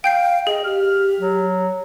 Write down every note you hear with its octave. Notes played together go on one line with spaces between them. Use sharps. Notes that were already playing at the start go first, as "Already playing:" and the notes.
F5 G5 G6 C7
G#4 D#5
G4 F6
F#3